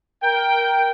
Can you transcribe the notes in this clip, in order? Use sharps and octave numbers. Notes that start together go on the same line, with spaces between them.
A#4 G5